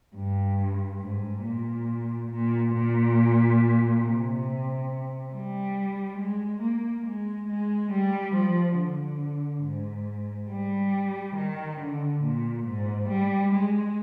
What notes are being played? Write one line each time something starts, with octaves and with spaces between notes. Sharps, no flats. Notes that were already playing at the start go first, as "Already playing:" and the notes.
G2
G#2
A#2
A#2
A#2
C3
G3
G#3
A#3
G#3
G#3
G3
F3
D3
G#2
G3
D#3
D3
A#2
G#2
G3
G#3